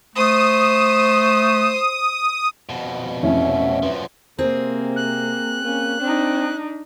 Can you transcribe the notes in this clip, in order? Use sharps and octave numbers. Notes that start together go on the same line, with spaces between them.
A3 C5 D#6
F2 B2
F1 A2 E3 C#4 E5
F#2 F3 B4
C3 A#3 C4 G#4
F#6
A#3 C#4
C4 D4 D#4